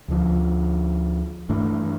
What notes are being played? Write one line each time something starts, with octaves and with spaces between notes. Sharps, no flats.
D2 D3 F3
G2 E3 A3 D4